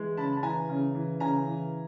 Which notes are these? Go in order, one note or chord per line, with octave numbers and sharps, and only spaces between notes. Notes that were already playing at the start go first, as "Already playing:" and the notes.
Already playing: E3 G#3
C#3 A5 B5
A5
E3 G#5 A#5
C#3
E3
C#3 G#5 A#5
E3